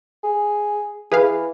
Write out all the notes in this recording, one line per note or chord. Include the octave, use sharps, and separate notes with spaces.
G#4
E3 G#4 B4 F5